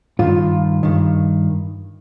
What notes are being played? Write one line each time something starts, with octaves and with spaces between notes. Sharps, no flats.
G2 D#3 F4
G2 D#3